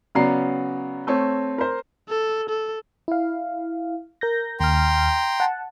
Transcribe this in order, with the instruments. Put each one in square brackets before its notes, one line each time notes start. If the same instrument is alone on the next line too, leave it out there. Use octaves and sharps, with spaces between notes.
[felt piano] C#3 F#3 B3 D5 A#5 C7
A3 C4 C#5
A#4 C5
[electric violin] A4
A4
[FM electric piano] E4 F5
A#4 G6 A#6
[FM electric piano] D#2 F6 [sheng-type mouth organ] G5 A#5 C6
[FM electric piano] F#5 A5